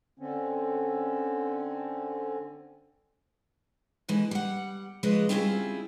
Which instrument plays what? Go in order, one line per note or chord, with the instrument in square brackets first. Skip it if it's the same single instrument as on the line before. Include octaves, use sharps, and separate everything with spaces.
[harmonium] D3 C4 C#4
[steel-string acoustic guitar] B2 D3 E3 G#3
G3 F#5
C#3 F3 G#3 D4 B4 D#5
G3 C4 C#4 E4 F4 G#4